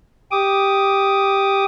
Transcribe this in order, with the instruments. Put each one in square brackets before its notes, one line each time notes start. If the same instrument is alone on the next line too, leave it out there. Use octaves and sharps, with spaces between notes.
[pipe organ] G4 D6 D#6